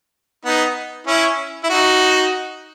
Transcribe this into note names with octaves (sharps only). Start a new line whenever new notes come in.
B3 D#4
C#4 E4
E4
D#4 F#4